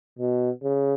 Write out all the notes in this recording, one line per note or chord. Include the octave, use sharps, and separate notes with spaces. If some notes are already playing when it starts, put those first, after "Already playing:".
B2
C#3